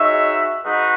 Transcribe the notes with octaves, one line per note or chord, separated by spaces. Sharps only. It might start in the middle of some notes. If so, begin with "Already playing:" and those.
Already playing: G#3 D#4 F#4 C#5 E5
G#3 D#4 F#4 B4